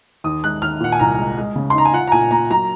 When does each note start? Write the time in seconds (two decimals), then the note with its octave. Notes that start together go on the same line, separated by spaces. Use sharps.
0.24 D#2 D#6
0.44 G#3 F#6
0.62 D#2 F6
0.80 A#2 F#5
0.92 G#5
0.99 C2 A#5
1.19 G#3
1.38 G#3
1.56 C#3
1.70 C6
1.75 D#4 A#5
1.85 G#5
1.93 F4 F#5
2.08 A#5
2.12 A#2 G#5
2.31 A#3 A#5
2.50 F#3 A#5